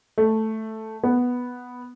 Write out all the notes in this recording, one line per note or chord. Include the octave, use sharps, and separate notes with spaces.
A3
B3